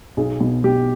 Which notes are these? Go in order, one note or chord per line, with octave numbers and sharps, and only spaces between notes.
B1 G#4
B2
B2 G4